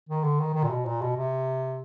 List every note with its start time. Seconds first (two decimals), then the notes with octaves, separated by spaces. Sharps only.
0.09 D#3
0.24 D3
0.40 D#3
0.54 D#3
0.64 A#2
0.70 B2
0.86 A#2
1.02 B2
1.16 C3